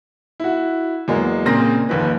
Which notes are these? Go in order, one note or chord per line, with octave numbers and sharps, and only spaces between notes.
E4 F#4
E2 F#3 G#3 A#3
A#2 C#3 A#3 C4 A#6
F#1 D#2 F3 B4